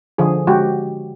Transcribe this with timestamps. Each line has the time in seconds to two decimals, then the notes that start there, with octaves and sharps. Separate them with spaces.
0.18 D3 F3 G#4
0.47 G#3 F#4 G4